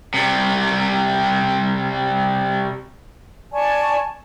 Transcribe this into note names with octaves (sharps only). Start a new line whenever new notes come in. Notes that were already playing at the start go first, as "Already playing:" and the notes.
C3 G3
D5 G#5 A5 C#6